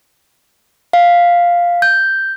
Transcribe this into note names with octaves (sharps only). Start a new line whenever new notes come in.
F5
G6